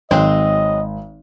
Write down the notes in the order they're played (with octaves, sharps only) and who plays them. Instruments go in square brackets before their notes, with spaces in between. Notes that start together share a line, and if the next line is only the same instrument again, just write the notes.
[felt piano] G#1 [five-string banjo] F#3 G#3 C4 [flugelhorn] D#5